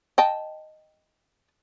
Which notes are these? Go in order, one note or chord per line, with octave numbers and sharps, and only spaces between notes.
D#5 G5 A5